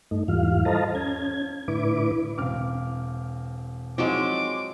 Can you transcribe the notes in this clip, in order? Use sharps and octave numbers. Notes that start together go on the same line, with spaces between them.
G2 A3 D#4
E2 G#2 E3 G3 F4 F5
A4 C5 D#5 F5 A5 A#5
C#4 G#6
A2 D3 E4 B4 D6
E1 C4 F5 D6 F6
F3 F#3 G#3 C4 D#4 D6